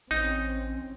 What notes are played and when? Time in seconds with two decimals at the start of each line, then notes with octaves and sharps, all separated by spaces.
0.11 A1 C4 C#4 D#4